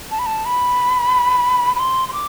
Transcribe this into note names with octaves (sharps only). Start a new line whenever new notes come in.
A5
B5
A5
B5
B5
C6
C6
D6